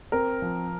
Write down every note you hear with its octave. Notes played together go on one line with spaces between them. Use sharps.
C4 A#4
F3